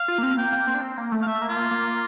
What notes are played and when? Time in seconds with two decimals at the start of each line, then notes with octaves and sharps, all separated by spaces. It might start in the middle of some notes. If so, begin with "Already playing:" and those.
Already playing: F5
0.08 F4
0.18 A#3
0.23 C4
0.37 A#3 G5
0.52 A#3
0.67 C4
0.75 D4
0.82 C4
0.98 A#3
1.12 A3
1.22 F5
1.26 A3 E5
1.42 A#3
1.49 F4
1.57 A#3
1.71 A#3